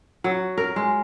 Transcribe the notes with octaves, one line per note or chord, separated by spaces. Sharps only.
F#3
A#4
G#3